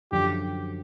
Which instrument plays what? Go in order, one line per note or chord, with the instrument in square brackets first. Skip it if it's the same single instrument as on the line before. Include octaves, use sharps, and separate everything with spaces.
[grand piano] F#2 D3 F3 [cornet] G4